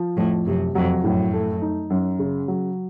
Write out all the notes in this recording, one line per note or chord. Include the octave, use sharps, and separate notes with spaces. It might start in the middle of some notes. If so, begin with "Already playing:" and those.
Already playing: F3
F2 A2
F#2 C3
F2 F#3
F#2 A2
A3
D#4
F#2
C#3
F#3